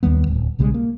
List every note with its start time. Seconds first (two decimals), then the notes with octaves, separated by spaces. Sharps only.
0.03 D#2 D#3 G3 B3
0.27 D1
0.59 B1 C#3 G3 G#3
0.74 A#3